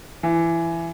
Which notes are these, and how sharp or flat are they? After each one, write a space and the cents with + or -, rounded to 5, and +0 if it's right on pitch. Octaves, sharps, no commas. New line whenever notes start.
E3 +20